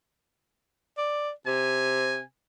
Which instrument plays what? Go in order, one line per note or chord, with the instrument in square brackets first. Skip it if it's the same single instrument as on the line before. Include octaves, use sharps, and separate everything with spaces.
[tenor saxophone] D5
[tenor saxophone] C3 [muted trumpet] G#5